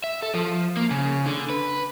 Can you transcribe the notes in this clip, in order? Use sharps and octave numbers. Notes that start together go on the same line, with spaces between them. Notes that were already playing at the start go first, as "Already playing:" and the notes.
E5
A4
F3
A#3
C#3
D3
B4